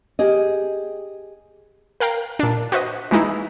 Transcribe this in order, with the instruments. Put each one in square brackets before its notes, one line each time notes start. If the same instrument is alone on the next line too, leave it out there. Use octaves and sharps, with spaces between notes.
[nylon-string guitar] G4 G#4 D#5
[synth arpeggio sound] A#4 F5 G5 A#5
A#2 D4
F#4 B4 C5 D#5
E3 G#3 D#4 E4